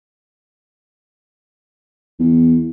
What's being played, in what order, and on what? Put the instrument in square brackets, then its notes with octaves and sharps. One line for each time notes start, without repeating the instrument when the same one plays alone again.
[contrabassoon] E2